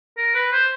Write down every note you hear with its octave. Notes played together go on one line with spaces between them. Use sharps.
A#4
B4
C5